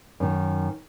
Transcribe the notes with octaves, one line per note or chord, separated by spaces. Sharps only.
F#2 D#3